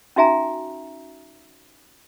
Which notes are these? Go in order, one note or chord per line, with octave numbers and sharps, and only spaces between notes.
C#4 D#4 F#4 E5 G#5 A#5